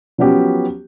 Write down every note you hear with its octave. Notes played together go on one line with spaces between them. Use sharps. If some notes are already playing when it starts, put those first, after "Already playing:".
F3 F#3 B3 C#4 G4